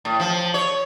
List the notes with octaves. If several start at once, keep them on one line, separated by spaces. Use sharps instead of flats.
A2
F3
C#5